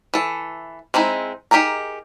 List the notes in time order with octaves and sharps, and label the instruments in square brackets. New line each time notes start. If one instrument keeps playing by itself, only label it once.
[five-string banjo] E3 A4
G#3 C4 D#4 E4
D#4 G4 G#4 A#4 A#5